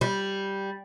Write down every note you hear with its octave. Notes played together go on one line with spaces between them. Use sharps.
G3